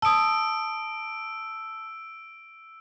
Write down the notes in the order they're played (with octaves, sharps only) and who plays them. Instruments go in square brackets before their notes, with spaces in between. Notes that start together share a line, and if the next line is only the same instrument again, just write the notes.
[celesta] A5 D#6 [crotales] E6 D7